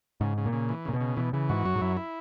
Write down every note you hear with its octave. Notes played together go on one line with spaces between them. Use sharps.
G#2 C#3
C#3
A#2
C#3
E3
A#2 C#3
B2
C#3
B2 E3
C#3 E3
G#2 F#4
F#2 F#3
G#2
F#2 E4
E4